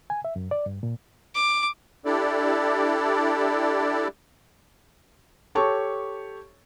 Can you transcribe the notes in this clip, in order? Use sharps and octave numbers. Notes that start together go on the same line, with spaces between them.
G#5
E5
F#2
D5
G2
A#2
D6
D4 E4 G4 A4 D5
G4 A4 C#5 A5 C#6